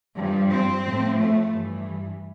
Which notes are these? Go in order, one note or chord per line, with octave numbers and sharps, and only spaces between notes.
G2 F3
C4
A2 F3
A3
G2 E3